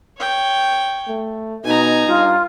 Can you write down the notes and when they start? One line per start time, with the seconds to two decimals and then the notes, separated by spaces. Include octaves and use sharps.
0.18 C#5 G5
1.08 A3
1.65 B2 D#4 G#5 A#5
2.06 G2 F4